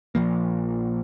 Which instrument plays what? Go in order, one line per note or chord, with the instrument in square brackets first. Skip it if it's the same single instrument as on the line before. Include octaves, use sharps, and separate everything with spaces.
[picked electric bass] A#1 F3 A#3